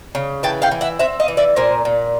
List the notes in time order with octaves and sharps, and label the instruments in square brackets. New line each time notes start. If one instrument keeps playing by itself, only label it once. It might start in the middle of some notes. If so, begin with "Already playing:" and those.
[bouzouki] C#3
E3 G5 A5
F5 G5
E3
E5 F#5
C4 E5 F#5
D#5 F5
E3
D5 E5
A#2 A#4 C5
A#2